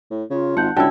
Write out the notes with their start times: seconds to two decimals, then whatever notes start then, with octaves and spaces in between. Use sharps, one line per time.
0.11 A2
0.30 C#3 F4
0.57 G#1 F#5 A5 G6
0.77 C#2 D3 E4 F#4 C#5 G5 A5